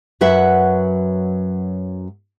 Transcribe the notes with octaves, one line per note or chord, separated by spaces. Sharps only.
F#2 F#3 B4 E5 F#5